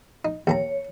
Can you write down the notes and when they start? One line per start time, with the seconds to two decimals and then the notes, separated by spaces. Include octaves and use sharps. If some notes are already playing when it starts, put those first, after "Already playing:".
0.25 D#4
0.47 D#2 C#5 A5 A#5